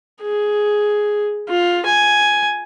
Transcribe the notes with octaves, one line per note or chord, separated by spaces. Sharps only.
G#4
F4
G#5